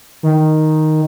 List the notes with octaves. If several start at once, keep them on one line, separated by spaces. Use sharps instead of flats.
D#3